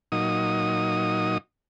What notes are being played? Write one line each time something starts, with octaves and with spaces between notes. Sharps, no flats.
A#2 F#3 D#4 D#6